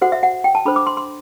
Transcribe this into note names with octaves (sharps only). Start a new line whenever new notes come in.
F#4 A4 C5 F#5
E5
F#5
G5
A5
D4 A4 C5 B5
D6
C6
C6